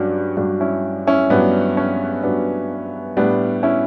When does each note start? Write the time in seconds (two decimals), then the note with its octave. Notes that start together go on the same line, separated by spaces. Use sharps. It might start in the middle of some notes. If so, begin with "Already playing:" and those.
Already playing: G2 F#3 C#4 D4 F#4
0.37 G2 F#3 D4 F#4
0.60 C#4 E4
1.07 C#4 E4
1.30 G2 F#3 B3 D4
1.77 C#4
2.23 G2 F#3 B3 D4
3.17 A2 G3 B3 D4
3.63 C#4 E4